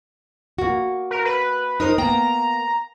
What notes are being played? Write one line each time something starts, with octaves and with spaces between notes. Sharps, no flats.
A#3 F#4
A#4
B4
D#4 A#4 C5 D#6
A#3 B3 G5 A#5